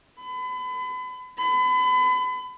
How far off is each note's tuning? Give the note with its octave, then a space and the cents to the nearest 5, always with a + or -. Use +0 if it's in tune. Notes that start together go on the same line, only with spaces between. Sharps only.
B5 +35
B5 +35